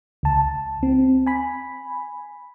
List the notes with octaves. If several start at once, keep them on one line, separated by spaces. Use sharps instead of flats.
C#2 A5
C4
G#5 B5